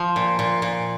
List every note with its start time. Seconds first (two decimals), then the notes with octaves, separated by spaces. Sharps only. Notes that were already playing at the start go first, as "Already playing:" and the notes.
Already playing: F3
0.16 A#2
0.39 A#2
0.62 A#2